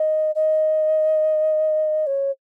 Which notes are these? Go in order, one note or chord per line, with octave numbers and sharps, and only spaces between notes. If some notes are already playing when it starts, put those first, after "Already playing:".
Already playing: D#5
D#5
C#5